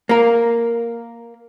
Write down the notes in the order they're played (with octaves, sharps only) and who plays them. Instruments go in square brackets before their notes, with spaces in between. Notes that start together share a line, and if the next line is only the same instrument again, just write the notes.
[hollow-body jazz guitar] A#3 A#4